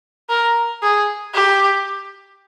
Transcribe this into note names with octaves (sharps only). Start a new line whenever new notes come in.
A#4
G#4
G4